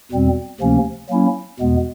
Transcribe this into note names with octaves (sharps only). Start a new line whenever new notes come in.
E2 B2 G3 C4
D2 C3 F3 A#3 C#4
F#3 A#3 C#4 E4
E2 B2 G#3 B3